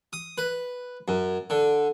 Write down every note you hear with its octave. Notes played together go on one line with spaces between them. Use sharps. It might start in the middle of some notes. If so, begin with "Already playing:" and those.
D#6
B4
F#2
D3